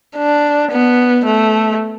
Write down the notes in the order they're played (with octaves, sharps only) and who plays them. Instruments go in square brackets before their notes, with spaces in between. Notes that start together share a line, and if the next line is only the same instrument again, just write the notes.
[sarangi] D4
B3
A3